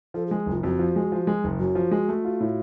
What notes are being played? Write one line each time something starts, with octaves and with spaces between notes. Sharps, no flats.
F3 A4
G#4
G#3
F#1 F4
F2 F#4
F3
G#3
F3
G#3
F#1
F#2 F#4
F3
G#3
A3
F4
A2